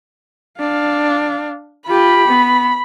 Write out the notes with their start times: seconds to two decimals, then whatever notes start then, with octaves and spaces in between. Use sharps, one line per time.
0.60 D4 F5
1.88 F4 G4 B5
2.28 B3